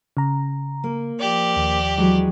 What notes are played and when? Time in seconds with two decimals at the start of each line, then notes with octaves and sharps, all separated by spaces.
0.17 C#3 A#5
0.84 A#3
1.19 F3 G4 D5
1.56 D#2
1.98 E3 F#3 G#3